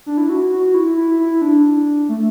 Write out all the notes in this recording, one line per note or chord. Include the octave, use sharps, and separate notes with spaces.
D4
E4
F#4
F#4
E4
E4
E4
D4
A3